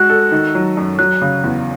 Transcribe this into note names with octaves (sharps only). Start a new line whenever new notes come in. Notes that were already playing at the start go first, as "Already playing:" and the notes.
Already playing: G#3 F#4 F#6
A4
D#3
F#3
F#2
F#3 F#6
C#3
E2